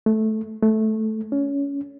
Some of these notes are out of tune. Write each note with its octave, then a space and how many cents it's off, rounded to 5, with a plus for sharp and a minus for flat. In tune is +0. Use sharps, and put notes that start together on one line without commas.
A3 -10
A3 -10
C#4 +25